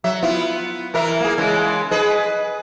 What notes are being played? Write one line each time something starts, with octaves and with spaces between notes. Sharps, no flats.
F#3 E5
B3 E4 F4
E3 A#4 E5
A#3 G#4
C#3 E3 G#3
G#4 B4 D#5